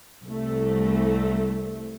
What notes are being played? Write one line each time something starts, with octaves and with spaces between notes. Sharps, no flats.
C2 A3